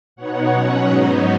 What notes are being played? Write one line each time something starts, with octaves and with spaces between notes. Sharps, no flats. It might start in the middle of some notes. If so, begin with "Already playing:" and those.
B2 B3 D#4 C#5 F#5
B2 F#3 C#4
G#2 F#3 B3 D#4